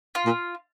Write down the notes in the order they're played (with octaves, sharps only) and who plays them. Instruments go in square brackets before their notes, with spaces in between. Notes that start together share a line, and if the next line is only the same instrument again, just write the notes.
[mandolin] F4
[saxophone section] A#2